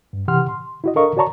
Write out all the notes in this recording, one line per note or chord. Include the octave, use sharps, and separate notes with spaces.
G2
C3 E3 G4 F#5 C6 F6
C6
E4 F#4 D#5
D4 A4 A#4 D#5 F5 C#6
F#4 C#5 D5 A5 A#5 C#6